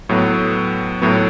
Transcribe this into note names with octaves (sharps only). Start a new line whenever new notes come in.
A2 F#3 B3
A2 F#3 B3